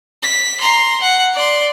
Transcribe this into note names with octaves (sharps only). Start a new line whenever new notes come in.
B6
A#5 C6
F#5
D5 C6